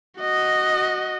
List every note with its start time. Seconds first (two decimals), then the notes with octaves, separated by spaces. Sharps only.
0.20 F#4 D#5